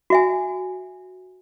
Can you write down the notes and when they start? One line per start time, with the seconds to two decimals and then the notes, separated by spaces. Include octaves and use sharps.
0.10 F#4 E5 G#5